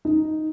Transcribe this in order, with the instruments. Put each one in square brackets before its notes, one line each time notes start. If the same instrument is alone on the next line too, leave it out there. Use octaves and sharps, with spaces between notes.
[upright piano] D#4